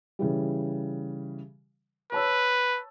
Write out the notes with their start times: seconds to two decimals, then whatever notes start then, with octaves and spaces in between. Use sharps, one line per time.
0.19 C#3 E3 G3
2.12 B4 C#5 A5 E6